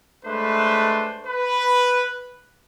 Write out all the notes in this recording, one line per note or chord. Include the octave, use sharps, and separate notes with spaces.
G#3 A3 D4 B4 C5 E5
B4